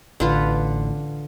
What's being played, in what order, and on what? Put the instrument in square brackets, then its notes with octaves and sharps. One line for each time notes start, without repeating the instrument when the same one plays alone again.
[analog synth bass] A1 [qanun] D3 F4 B4